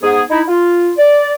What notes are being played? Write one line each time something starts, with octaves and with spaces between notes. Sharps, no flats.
G#2 B3 G#4
D#4 E4
F4
D5